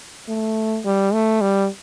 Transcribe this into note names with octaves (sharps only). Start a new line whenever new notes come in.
A3
G3
A3
G3